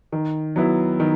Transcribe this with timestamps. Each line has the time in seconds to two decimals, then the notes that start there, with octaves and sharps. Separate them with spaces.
0.12 D#3
0.56 F#3 B3 E4
1.00 D#3